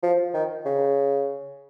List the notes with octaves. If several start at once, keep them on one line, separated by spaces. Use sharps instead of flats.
F3
D#3
C#3